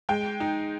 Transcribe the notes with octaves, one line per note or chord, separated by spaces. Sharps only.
G#3 G5
D#4